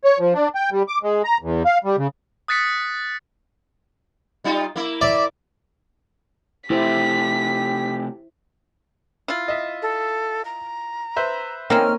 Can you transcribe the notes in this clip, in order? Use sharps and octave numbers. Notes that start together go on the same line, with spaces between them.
C#5
F3
D4
G5
G3
D6
G#3
A#5
E2
F5
G3
C#3
D#6 F#6 A6 B6 C#7
G3 D#4 F4
A#3 E4
D5 E5
C3 A3 E4 G4 C5 B6
E4 F4
D#5 E5
A4
A#5
B4 C5 E5
D#3 A#3 C4 C#4 F6